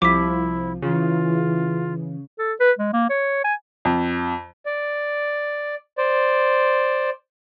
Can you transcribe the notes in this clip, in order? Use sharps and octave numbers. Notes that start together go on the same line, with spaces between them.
C2 F3 E4 D6 B6
C#3 E3 F4
A4
B4
G#3
A#3
C#5
G#5
F2
D5
C5 D5